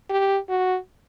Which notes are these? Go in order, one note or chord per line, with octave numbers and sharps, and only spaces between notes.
G4
F#4